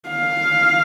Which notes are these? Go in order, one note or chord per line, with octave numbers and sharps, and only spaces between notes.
F5